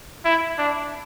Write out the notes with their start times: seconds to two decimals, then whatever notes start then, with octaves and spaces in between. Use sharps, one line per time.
0.25 E4
0.58 D4